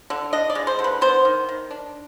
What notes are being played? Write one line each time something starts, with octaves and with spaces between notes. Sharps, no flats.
D3
D4 D#5
D5
G#3
C5
D3
B4
B3 C5
D#3
D#3
D4